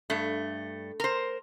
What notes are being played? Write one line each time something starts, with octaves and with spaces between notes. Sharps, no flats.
G2 A3
A#4 C5